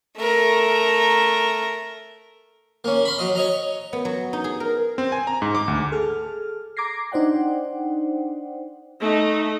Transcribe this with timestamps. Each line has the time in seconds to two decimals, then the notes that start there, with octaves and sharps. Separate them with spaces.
0.18 A3 A#4
2.84 A#3 C#4
3.05 B5 C6
3.18 F#3 D#5
3.35 C#5 D#5 A#5
3.93 B3
4.05 F#3
4.33 D#4
4.44 G#4
4.60 A#4
4.98 C4
5.12 G#5
5.27 A#5
5.42 G#2
5.55 D6
5.68 D2
5.92 G#4 A4 F6
6.77 A#5 D6 G#6 A#6 C7
7.12 D4 D#4 C5 D5 F#5 G5
9.01 A3 D#4